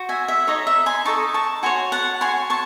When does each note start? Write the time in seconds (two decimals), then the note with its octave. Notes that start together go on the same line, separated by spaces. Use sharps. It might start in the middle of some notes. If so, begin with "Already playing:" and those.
Already playing: F#4 C5
0.09 E5 G#5
0.28 E5
0.47 D#4 A4 C#5 D#5
0.67 E5
0.86 G#5 C6
1.05 D#4 A4 D#5 A5 C#6
1.34 A5 C#6
1.63 F#4 C#5 G#5 C6
1.92 F#5 A5
2.21 F#4 C#5 G#5 C6
2.50 A5 C#6